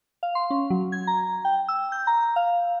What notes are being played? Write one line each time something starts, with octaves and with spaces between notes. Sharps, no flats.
F5
C6
C#4
F#3
G#6
A#5
G5
E6
G6
A#5
F5